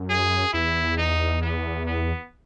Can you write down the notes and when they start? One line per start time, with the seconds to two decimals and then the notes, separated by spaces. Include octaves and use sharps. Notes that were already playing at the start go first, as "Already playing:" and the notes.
Already playing: F#2
0.10 G#4
0.53 E2 E4
0.97 D#4
1.42 B3
1.86 B3